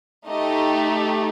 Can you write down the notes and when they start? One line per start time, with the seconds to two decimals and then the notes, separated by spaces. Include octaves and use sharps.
0.28 A3 D#4 G4 D#5